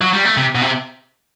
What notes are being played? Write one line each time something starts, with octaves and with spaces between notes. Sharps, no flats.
F#3
G3
A3
C3
B2
C3